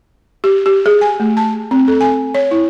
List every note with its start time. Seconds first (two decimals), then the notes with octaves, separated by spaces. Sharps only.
0.44 G4
0.66 G4
0.86 G#4
1.01 G#5
1.20 A3
1.37 A5
1.71 C4
1.88 A4
2.01 G#5
2.35 C#5
2.51 E4